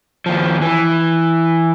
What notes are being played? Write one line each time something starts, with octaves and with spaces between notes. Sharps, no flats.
D#2 F3
E3